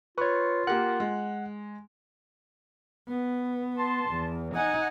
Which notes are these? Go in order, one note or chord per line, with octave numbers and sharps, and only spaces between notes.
F4 B4 C#5 C#6
A#3 G4 A#4 F#5 F#6
G#3
B3
A5 C6
E2
D#4 F#5 G#5